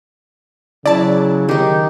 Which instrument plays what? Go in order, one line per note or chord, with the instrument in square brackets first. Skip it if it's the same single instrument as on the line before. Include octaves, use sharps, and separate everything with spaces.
[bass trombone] C#3 [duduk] F#3 [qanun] E4 [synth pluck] D5 A5
[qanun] D#3 D#4 [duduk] G4